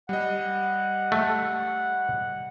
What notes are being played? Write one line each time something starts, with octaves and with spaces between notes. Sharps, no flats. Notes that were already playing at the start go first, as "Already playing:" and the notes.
G3 D#5 F#5
A3